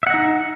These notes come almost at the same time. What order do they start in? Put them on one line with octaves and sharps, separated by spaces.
E5 F#5 D#5 D#4